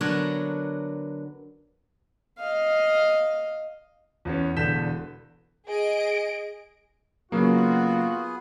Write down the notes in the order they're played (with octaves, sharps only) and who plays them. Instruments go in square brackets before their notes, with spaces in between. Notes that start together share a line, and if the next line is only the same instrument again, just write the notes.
[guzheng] D3 F#3 B3 A#4 C#5 A5
[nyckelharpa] D#5 F5
[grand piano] E2 B3 C#4
E1 E2 D3 G6 B6 E7
[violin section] G#4 D#5 D7
[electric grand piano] C#3 F#3 A#3 [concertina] B3 G#4 [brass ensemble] F4 F#4